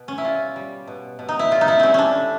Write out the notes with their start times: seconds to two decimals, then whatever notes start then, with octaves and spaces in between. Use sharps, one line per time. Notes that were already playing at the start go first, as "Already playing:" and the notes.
Already playing: B2
0.08 C#4
0.18 E4
0.24 G3 F4
0.56 G3
0.87 B2
1.19 B2
1.29 D#4
1.39 E4
1.51 G3 F4
1.61 D#4
1.68 E4
1.79 G3 C4 C#4
1.94 C#4 D4
2.15 D3